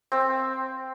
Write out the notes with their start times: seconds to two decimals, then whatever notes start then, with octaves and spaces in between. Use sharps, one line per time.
0.12 C4